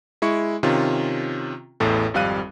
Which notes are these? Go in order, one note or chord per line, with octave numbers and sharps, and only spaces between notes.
G#3 E4 C#6 C#7
C3 D#3 C#4 F4
A1 E2 A2 A4
G#1 F2 G3 F5 F#6 D#7